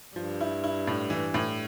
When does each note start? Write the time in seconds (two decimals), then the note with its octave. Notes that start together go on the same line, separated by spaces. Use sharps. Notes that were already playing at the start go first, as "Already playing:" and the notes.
0.16 G2 F3
0.41 E4
0.64 E4
0.87 A2
1.10 E3
1.34 A2